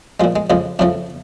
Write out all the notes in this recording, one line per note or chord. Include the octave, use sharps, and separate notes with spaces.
A#2 F3 G#3
G#3
F2 C#3 F3 G#3
F2 C#3 F3 A3